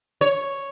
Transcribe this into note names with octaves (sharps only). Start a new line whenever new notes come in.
C#5